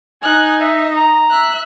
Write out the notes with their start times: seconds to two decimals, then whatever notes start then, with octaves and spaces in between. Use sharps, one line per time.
0.23 D#4 G#5 F#6
0.60 D#5 E5
0.97 A#5
1.31 E5 F#6